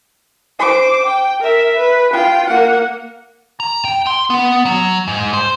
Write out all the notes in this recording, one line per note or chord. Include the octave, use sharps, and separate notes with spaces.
C5 D6
G5
A#4 E5
B4
F4 G5
A#3 F#5
A#5
G5
C6
B3
F#3
G#2
C5